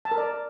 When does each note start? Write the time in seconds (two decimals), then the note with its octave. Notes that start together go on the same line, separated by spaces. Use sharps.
0.05 A5
0.11 A#4
0.18 D5